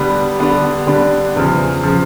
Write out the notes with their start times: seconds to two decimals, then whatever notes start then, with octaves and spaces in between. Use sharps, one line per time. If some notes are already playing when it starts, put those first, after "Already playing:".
Already playing: D3 G3 B3 D4
0.39 D3 G3 B3 D4
0.87 D3 G3 B3 D4
1.36 E2 C#3 F3
1.83 C#3 F3